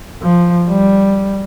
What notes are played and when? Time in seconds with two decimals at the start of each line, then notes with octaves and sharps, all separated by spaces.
0.22 F3
0.67 G3